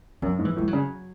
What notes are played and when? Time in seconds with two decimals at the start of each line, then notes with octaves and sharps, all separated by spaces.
0.22 F#2 F#3
0.39 G#2
0.45 E3
0.56 A2 G#3
0.67 F#3
0.73 C#3